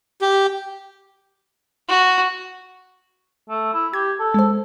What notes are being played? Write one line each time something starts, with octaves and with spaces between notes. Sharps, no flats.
G4
F#4
A3
E4
G4 G#6
A4
G#3 C5